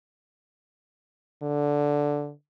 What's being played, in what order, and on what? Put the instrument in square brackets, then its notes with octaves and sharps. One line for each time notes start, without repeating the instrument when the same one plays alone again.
[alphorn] D3